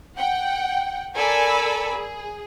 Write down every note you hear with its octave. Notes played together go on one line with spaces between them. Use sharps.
F#5 G5
A4 A#4 D5 G#5 B5 E6
G#4